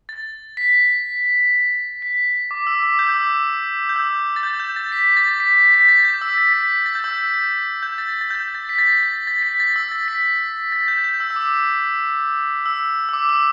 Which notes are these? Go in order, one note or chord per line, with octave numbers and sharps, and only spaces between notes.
A6
B6
B6
D6
E6
D6
G6
E6
D6
E6
G6
E6
A6
G6
G6
A6
B6
A6
B6
B6
B6
A6
G6
E6
A6
B6
A6
G6
E6
G6
G6
G6
A6
A6
G6
A6
B6
A6
A6
A6
B6
A6
E6
A6
B6
A6
G6
G6
E6
E6
D6
E6
E6
D6
E6